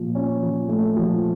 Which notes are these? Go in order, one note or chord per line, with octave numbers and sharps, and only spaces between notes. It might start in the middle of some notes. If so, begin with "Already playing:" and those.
Already playing: A#2 F3
C#4
F3
A3
F3